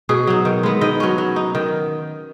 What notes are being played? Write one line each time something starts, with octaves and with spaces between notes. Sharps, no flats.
B2 G#4
F#3 D#4
D#3
G#3 B3
D#3 D#5
F#3 C#4
F#3
D#4
D#3